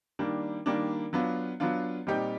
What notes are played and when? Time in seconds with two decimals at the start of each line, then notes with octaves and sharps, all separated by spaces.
0.19 D#3 G3 A#3 D4
0.66 D#3 G3 A#3 D4
1.13 F#3 B3 D4 F4
1.60 F#3 B3 D4 F4
2.07 A#2 G3 C4 D#4 G4